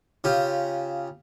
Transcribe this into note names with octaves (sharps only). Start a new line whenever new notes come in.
C#3 F4 G4